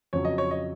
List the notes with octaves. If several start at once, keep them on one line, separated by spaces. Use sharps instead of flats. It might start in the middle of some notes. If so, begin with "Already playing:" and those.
F2 C#3 F#3 C#5
D#5
C#5
D#5